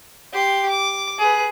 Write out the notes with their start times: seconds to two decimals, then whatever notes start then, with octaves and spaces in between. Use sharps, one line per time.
0.33 G4 C6
0.69 D6
1.19 G#4 B4